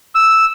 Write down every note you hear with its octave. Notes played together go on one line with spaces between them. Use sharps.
E6